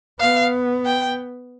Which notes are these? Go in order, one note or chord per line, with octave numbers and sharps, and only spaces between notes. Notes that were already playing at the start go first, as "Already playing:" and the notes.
B3 F5
G5